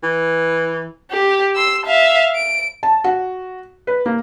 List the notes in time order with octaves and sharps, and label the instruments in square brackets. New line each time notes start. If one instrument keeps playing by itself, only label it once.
[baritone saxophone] E3
[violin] G4
C6 E6
E5 F5
D7
[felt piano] A5
F#4
B4
A#3